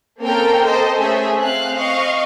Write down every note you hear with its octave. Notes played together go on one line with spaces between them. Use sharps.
A#3 C4 C#4 A4 A#4 G5
A4 C5 D#5
A3 C#4 G#4 E5
C4 F5 F#6
D#5 F5 C#6